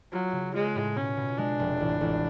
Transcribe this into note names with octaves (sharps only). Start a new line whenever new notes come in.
F#3 F4
C#3
G#3 F4
A2
B2 C#4
B2
G#3 D4
F1
A1
A1